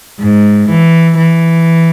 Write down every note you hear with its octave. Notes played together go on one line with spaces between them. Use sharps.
G#2
E3
E3